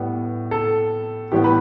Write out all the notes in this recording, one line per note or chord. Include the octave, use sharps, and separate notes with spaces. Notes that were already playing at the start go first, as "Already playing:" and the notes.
Already playing: A2 G3 B3
A4
A2 E3 G3 B3 G4
B4